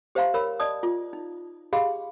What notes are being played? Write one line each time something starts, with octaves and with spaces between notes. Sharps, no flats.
G4 C5 E5 F5 A#5 C6
A#4 C#5 B5 E6
D5 D#5 A5 D#6
F4
D#4
G4 G#4 D#5 F5 B5 C6